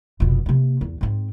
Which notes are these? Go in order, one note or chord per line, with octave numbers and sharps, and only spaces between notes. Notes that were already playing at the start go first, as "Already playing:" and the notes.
F1 B2
C3 A#3
E2
G#2 C4